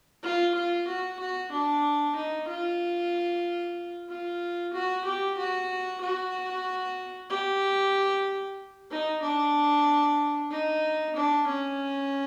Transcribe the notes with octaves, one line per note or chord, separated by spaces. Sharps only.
F4
F4
F#4
F#4
D4
D#4
F4
F4
F#4
G4
F#4
F#4
G4
D#4
D4
D#4
D4
C#4